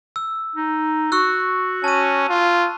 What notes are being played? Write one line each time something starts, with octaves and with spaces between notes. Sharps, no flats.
E6
D#4
F#4 C#6 E6 F#6
C#4 A5 D#7
F4